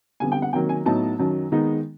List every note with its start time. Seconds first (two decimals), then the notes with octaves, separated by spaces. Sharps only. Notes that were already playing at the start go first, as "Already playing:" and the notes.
0.20 F2 D3 G3 B3 G#5
0.32 G5
0.42 F#5
0.53 C3 D#3 F#3 A#3 G5
0.69 G#5
0.85 A2 F#3 B3 D#4 A5
1.19 F#2 D#3 F#3
1.52 D#3 G#3 B3 D#4